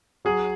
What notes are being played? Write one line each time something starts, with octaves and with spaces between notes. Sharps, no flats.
F#3 G#4